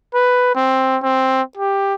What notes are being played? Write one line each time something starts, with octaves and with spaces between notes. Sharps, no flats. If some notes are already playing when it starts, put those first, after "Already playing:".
B4
C4
C4
G4